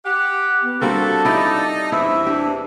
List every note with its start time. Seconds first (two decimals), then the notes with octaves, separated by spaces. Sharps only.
0.06 G4 F#5
0.63 B3
0.82 G3 A3 A#3 C4 D4 F#4 A4
1.25 D#4 E4 G4 D5
1.92 E2 C3 E3 E4 E5
2.27 D4 G4